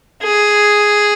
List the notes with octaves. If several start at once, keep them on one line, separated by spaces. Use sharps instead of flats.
G#4